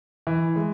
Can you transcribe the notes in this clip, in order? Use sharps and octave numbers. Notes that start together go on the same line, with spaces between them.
E3
G#3